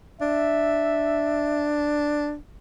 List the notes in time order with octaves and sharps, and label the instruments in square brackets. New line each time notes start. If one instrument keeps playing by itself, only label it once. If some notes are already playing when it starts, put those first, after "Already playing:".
[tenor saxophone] D4 [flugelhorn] E5